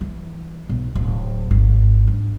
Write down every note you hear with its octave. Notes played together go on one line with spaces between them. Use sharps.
E3
B1
D1
G#1
D4